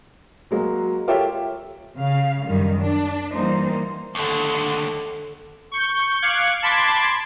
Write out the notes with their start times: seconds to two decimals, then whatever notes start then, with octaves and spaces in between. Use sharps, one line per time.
0.51 F#3 G#3 A#3 F#4
1.08 F4 G4 A4 A#4 C#5 E5
1.97 C#3 F5
2.45 F#2 D#3 G3
2.80 D4
3.33 E3 G3 A#3 D#4 C5
4.15 D#2 D3 A4
5.72 C#6 G6
6.22 F5 D6 F#6 G#6 C#7
6.63 A5 B5 C6 D6 G#6 A6